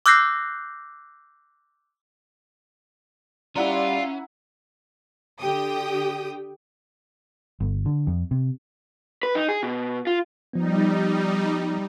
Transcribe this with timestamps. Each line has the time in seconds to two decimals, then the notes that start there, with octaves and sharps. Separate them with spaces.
0.06 D6 E6 F#6 G6 A#6 C7
3.56 G3 C#4 E4 F4 D5 F#5 A#5
5.40 D3 G4 G5 D#6
7.60 G1
7.86 D3
8.07 F2
8.31 C3
9.23 B4
9.35 D#4
9.49 G#4
9.63 B2
10.07 F4
10.53 F3 G3 B3 D#4